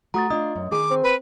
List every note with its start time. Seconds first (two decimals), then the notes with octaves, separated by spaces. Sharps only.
0.14 A3 F#4 C5 A#5 D#6 A6
0.30 D4 F4 D#5 D#6
0.56 F#2
0.71 D#3 G#4 G#5 D6
0.90 C4
1.03 B4